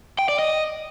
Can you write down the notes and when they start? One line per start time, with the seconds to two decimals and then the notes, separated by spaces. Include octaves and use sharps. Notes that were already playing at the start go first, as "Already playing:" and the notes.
0.19 G5
0.29 D5
0.39 D#5